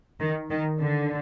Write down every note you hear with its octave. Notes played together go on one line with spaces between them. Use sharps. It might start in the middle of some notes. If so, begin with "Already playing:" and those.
D#3
D#3
D3